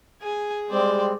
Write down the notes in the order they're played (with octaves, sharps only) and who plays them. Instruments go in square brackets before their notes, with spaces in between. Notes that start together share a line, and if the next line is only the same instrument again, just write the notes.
[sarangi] G#4 [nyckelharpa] G#5
[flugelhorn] G3 [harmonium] G#3 C4 [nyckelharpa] C5 D5